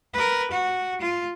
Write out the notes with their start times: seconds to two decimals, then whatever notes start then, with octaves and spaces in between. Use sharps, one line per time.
0.14 A#4 B4
0.51 F#4
1.01 F4